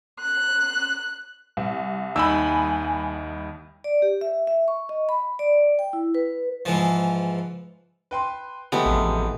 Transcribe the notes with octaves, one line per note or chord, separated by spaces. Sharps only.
F#6
C2
D#2 D#4 G#5 B5 E6
D5
G4
E5
E5
C#6
D#5
B5
D5
G5
E4
B4
G#2 E3 F3
B4 G5 C6
G#3 A3 B3 G4
A1 F2 C3